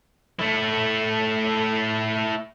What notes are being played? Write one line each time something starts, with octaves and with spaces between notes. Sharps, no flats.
A3 E4